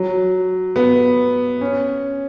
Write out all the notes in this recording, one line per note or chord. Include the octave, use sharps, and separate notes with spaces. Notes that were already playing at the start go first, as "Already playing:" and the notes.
Already playing: F#3
B3
C#4